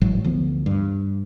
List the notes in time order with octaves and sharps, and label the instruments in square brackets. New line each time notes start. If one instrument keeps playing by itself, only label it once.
[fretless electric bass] G#1 A2 E3 F#3
D2 E3 F3 B3
G2